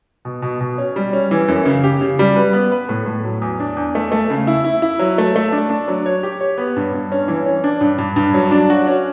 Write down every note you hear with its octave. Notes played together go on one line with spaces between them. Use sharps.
B2
B2
B2
C#4
G3
C#4
E3
F#2
C#3
G4
C#3
G3
B4
B3
B4
A2
A2
F#3
E2
D4
E2
A3
A3
C#3
E4
E4
E4
F#3
A3
A3
D4
D4
F#3
C#5
G4
C#5
B3
G2
G2
C#4
E3
C#4
D4
G2
G2
G2
F#3
D4
F#4
C#4